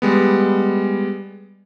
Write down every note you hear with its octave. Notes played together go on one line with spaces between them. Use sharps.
G3 G#3 B3